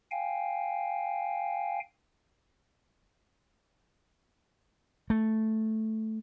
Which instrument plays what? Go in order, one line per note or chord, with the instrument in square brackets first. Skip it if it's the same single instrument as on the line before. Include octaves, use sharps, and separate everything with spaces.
[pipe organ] F5 G5 G#5
[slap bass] A3